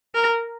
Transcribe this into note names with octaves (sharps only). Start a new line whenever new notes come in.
A#4